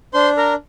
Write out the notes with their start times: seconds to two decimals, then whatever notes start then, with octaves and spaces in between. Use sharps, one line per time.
0.14 D4 C5 C6
0.37 A#4 A#5